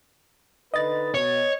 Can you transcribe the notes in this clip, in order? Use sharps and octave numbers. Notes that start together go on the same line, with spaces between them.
D3 D#4 B4 D#5 A6
B2 C#5